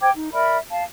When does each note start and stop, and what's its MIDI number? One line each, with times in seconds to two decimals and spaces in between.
0.01 0.10 72
0.01 0.10 79
0.01 0.10 86
0.01 0.10 92
0.15 0.33 63
0.33 0.57 70
0.33 0.57 74
0.33 0.57 76
0.33 0.57 83
0.70 0.83 77
0.70 0.83 81